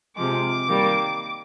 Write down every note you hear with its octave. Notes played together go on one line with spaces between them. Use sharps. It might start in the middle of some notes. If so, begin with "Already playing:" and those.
C3 F3 G#3 D6
D#3 G3 A#3